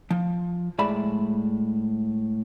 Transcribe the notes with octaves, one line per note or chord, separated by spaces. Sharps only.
F3
A2 G#3 D5 E5 B5